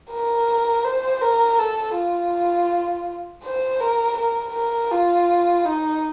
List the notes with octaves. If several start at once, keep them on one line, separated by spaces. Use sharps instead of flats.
A#4
C5
A#4
A4
F4
C5
A#4
A#4
A#4
F4
D#4